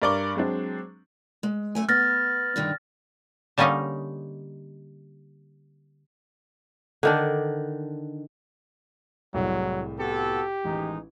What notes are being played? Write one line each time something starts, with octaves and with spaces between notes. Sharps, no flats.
G2 A#4 D5 C#6 D6 G7
F#3 G#3 C4 D4
G#3
F#2 A3 G#5
B3 F6 A6 A#6
G2 D3 D#3
D3 G3 A#3 C#4 D#4 D#5
D3 D#3 D4
C2 A2 F#3 G#3
B3 F#4 G4 A4
A1 D#3 G#3 D#4